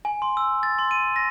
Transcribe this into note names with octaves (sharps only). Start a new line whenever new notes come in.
G#5
C6
E6
A6
C6
D#7
A#6